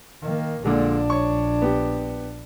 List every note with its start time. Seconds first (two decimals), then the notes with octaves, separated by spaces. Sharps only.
0.22 D#3 A#3
0.64 A#1 A#2 D3 G#3 D4
1.10 C#5 C#6
1.62 B3 G4